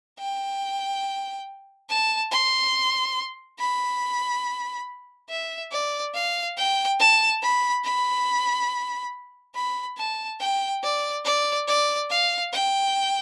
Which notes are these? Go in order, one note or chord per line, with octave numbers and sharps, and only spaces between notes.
G5
A5
C6
B5
E5
D5
F5
G5
A5
B5
B5
B5
A5
G5
D5
D5
D5
F5
G5